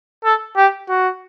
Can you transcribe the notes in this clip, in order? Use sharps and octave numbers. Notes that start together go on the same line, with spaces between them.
A4
G4
F#4